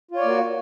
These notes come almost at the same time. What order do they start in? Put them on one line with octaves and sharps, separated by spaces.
F4 C#5 D5 A#3 F#4